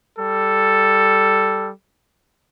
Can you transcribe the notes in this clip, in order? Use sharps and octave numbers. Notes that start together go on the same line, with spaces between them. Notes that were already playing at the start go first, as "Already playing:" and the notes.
G3 A4